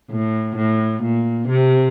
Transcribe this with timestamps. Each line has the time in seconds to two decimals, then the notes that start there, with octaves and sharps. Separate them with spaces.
0.10 A2
0.57 A2
1.03 A#2
1.48 C3